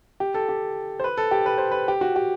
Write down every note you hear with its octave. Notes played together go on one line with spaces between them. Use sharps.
G4
A4
G4
C5
B4
A4
G4
B4
C5
B4
G4
F#4
G4